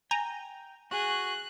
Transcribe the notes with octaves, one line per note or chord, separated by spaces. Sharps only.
G5 G#5 A#5
F#4 G#4 F#6